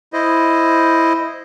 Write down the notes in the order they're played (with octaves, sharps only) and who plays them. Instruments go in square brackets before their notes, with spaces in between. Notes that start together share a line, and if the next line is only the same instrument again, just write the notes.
[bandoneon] E4 C5 D#5